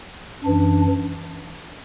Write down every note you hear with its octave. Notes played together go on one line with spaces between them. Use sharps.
F#2 E3 D4